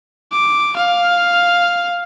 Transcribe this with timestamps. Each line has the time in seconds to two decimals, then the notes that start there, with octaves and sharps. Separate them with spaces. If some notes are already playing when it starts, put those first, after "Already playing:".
0.32 D6
0.76 F5